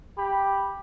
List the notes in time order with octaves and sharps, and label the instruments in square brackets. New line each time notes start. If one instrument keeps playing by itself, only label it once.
[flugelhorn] G4 [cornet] B5